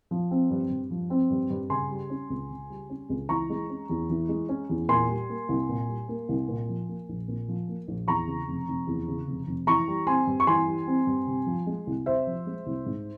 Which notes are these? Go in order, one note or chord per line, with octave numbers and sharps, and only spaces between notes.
F3
C4
G2
G2
F3
C4
G2
G2
C#3 G#5 C6
G3
C#4
C#2
C#3
G3
C#4
C#2
E3 A#5 C#6
G#3
C#4
E2
E3
G#3
C#4
E2
A#2 G#5 C6
G3
A#3
C2
A#2
G3
A#3
C2
A#2
F3
A#3
A#1
A#2
F3
A#3
A#1
E2 A#5 C#6
C#3
F1
F1
E2
C#3
F1
F1
E3 A#5 C#6
G3
C4 G#5 C6
G2
C#6
E3 G#5 C6
G3
C4
G2
C3
F3
G#3
C2
C3 C5 E5
F3
G#3
C2
G#2